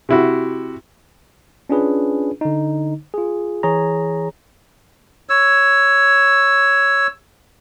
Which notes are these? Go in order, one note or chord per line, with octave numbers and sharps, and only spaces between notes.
C3 E4 F#4
C#4 D4 F4 G#4 B4
D3 D#4
F4 G#4
E3 G#4 C#5 A#5
C#5 E6